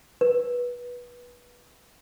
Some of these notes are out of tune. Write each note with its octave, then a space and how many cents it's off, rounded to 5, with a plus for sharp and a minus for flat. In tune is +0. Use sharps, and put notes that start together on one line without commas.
B4 -20